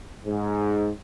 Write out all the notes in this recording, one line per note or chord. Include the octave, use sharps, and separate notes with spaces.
G#2